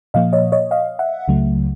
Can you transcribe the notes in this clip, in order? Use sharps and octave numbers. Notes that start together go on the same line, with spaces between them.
A#2 F3 A#3 D#5 F5
C#5 D#5
C#5 D#5
D#5 F5
E5 F#5
C#2 C#3 F#3 A3